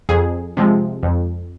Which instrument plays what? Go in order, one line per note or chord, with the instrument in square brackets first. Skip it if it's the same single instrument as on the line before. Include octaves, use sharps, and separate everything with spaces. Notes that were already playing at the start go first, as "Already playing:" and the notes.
[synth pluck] F2 G#4
C3 F3 G#3
F2